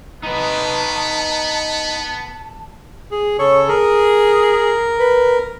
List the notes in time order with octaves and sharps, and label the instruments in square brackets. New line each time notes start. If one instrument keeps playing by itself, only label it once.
[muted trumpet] B3 [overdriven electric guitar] D#4 B4 [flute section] A5
[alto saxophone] G#4
[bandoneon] C#3 A4 [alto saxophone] C#5
[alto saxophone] G#4 [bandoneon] A#4
[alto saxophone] B4